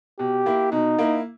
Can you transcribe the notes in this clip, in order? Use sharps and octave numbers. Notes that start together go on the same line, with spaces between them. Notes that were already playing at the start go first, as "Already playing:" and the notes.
B2 G4
A#3 E4
B2 D#4
A#3 E4